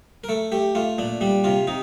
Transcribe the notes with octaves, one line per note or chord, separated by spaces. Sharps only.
A#4
A3 A4
A3 G4
A3 F4
A#2 D4
G3 D4
C3 F4
C3 D#4